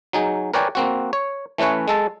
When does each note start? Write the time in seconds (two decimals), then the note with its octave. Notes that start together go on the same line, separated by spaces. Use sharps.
0.13 F#3 D#4 G#4
0.54 A#4 B4 C#5 D5 G5 G#5
0.75 A#3 C4 F#4
1.13 C#5
1.58 E3 A3 C#4 B4 C#5
1.88 G#3 A4 A5